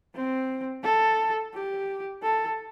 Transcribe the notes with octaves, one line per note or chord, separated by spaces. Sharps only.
C4
A4
G4
A4